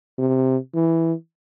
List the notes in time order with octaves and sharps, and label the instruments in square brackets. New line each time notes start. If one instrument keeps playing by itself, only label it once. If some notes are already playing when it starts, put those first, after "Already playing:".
[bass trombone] C3
E3